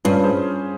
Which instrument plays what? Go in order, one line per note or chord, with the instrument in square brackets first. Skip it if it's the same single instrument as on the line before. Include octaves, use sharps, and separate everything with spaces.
[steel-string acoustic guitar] G2 [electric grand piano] C#4 F4
[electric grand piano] G#4 C5